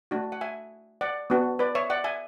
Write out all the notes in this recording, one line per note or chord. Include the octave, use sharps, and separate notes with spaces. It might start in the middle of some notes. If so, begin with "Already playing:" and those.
A3 D4 F#4
F#5
E5 G#5
D5 F#5
B3 D4 F#4
B4 D5
C#5 E5
D5 F#5
E5 G#5